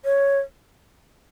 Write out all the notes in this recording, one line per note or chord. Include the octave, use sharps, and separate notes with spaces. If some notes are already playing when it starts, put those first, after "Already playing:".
C#5